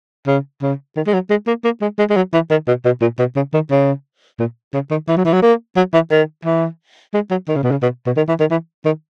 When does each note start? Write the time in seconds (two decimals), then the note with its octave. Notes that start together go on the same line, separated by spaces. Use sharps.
0.27 C#3
0.62 C#3
0.96 D#3
1.07 G#3
1.14 F#3
1.30 G#3
1.47 A#3
1.64 A#3
1.81 G#3
1.98 G#3
2.10 G#3
2.16 F#3
2.33 E3
2.50 D#3
2.67 B2
2.85 B2
3.01 A#2
3.19 B2
3.36 C#3
3.54 D#3
3.71 C#3
4.39 A#2
4.73 C#3
4.91 D#3
5.08 E3
5.17 F#3
5.25 E3
5.33 F#3
5.42 A#3
5.76 F#3
5.93 E3
6.11 D#3
6.45 E3
7.14 G#3
7.30 F#3
7.48 D#3
7.56 C#3
7.63 B2
7.71 C#3
7.82 B2
8.06 B2
8.16 D#3
8.28 E3
8.40 D#3
8.51 E3
8.85 D#3